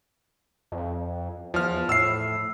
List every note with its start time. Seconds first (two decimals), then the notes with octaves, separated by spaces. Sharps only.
0.72 F2
1.54 E2 F3 F6
1.89 A2 E6 C7